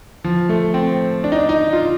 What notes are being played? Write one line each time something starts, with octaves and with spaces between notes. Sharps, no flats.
F3
A3
C4
D4
D#4
D4
D#4
F4